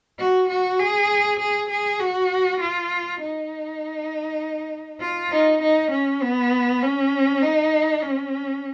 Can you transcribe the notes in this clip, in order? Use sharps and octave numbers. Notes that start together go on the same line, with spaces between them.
F#4
F#4
G#4
G#4
G#4
F#4
F4
D#4
F4
D#4
D#4
C#4
B3
C#4
D#4
C#4